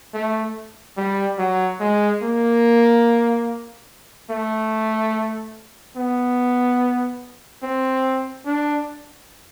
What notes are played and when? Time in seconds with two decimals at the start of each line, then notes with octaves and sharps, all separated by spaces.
0.14 A3
0.97 G3
1.38 F#3
1.80 G#3
2.22 A#3
4.30 A3
5.96 B3
7.62 C4
8.46 D4